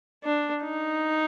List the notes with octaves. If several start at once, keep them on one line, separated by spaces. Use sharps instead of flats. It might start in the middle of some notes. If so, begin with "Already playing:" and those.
D4
D#4